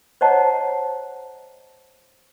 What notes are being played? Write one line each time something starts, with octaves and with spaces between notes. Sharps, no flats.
C5 C#5 D#5 F#5 A5 A#5